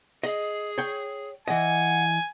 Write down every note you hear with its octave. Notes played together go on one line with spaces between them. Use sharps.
G#4 D#5
C#5 G5
E3 D#5 F#5 G#5